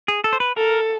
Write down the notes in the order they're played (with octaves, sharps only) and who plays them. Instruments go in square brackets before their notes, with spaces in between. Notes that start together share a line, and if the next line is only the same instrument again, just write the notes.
[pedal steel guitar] G#4
A4
C5
B4
[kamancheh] A4 [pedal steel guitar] A#4